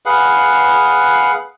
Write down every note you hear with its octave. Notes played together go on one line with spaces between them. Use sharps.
G#4 B4 F5 F#5